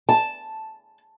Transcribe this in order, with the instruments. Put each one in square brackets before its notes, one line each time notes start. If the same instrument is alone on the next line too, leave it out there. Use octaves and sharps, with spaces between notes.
[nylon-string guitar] A5